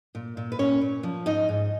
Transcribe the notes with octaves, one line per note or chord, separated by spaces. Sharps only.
A#2
A#2
B4
A#2 C#4 C#5
A#2
F3
G#2 D#4 D#5
G#2